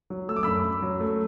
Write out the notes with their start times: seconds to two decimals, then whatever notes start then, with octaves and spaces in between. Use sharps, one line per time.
0.10 F#3
0.29 A3 E6
0.36 D6
0.43 F#2 B5 E6
0.64 F#2
0.82 F#3
1.00 A3